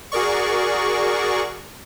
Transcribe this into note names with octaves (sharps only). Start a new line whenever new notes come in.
F#4 G#4 A#4 D5 C#6